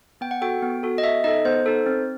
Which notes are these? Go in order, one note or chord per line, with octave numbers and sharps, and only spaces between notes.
B3 G5
F#5
F#4 A4 G5
B3
F#4 A4
D#5
B3 E5
D#4 A4 D#5
B3 C5
D#4 A4
C4